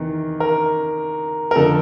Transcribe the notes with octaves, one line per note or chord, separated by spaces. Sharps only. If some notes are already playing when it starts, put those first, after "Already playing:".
Already playing: E2 C3 D#3
A#4
A#4
F2 D3 F3 A4